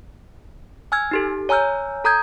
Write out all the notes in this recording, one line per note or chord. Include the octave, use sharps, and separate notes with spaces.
G#5 E6 F6 G#6
D#4 G4 A4
C#5 G#5 A#5 E6 F6 G6
A4 A#5 D#6 G6 G#6